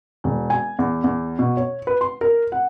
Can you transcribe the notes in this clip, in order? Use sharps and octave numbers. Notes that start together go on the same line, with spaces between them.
E1
G#5
E2
E2
B2
C#5
B4
C6
A#4
F#5